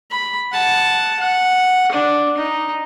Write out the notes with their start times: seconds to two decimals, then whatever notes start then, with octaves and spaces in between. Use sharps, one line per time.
0.11 B5
0.52 F#5 A5
1.19 F#5
1.92 D4
2.37 D#4